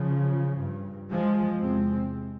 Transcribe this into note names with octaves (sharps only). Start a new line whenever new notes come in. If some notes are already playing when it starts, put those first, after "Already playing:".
Already playing: C#3 F3
G2
F3 G#3
E2 C3 G#3 C4